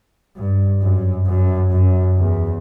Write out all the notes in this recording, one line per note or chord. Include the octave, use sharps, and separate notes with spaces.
G2
F#2
F#2
F#2
E2